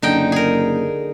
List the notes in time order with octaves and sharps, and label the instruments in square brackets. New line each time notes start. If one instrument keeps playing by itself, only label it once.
[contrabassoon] F#1 [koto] D3 D#4 G5
[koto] G#4 A#4